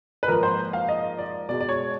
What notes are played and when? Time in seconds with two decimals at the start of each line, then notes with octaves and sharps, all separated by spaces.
0.23 B4
0.28 G#2 F3 A#3 A#4
0.43 C5
0.73 F5
0.89 D#5
1.18 D5
1.49 B2 D5
1.52 G#3
1.61 D5
1.69 C#5